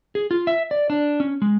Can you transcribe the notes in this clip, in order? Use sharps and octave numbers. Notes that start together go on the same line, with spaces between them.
G#4
F4
E5
D5
D4
C#4
G#3